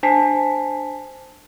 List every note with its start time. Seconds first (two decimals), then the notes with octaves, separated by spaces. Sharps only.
0.03 D4 C5 G#5 A5 B6 C7